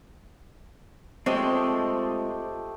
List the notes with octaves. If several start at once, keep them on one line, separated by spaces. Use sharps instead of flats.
F3 G#3 A3 C4 G4 D#5